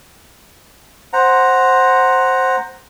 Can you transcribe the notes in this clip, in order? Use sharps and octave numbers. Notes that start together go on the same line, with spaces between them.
C5 F#5 A#5